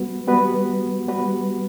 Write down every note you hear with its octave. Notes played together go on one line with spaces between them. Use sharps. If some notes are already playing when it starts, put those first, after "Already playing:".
Already playing: G3 B3 F#4 B4
G3 B3 F#4 B4
G3 B3 F#4 B4